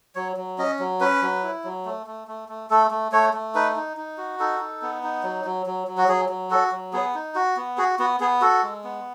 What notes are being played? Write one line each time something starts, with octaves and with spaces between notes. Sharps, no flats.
F#3 C#5
F#3
C#4 D#5
F#3
C#4 B4
F#3
E4
F#3
A3
A3
A3
A3
A3 A4
A3
A3 C#5
A3
D#4 B4
D#4
D#4
F#4
D#4 A4
D#4
B3
D#4
F#3
F#3
F#3
F#3
F#4
F#3 G#4
F#3
F#4 A4
F#3
B3 G#4
D#4
F#4
B3
F#4 G#4
B3 F#4
B3 G#4
F#4 A4
G#3
B3